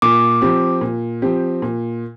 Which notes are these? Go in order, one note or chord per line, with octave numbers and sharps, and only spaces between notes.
A#2 D6
F3 C4 G4
A#2
F3 C4 G4
A#2